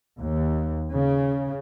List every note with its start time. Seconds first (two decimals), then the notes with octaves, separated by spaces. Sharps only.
0.18 D#2
0.92 C#3